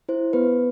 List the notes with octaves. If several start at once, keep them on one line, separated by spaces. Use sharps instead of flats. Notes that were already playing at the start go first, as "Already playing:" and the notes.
E4 C5
B3 B4